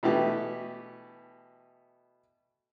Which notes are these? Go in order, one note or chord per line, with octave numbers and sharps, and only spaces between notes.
B2 E3 A3 G4